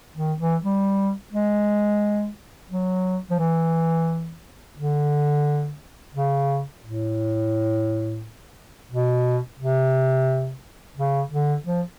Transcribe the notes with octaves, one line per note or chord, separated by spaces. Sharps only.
D#3
E3
G3
G#3
F#3
F3
E3
D3
C#3
A2
B2
C3
C#3
D3
F3